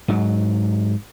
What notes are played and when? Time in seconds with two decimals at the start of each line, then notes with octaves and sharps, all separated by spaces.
0.08 G#2 F#3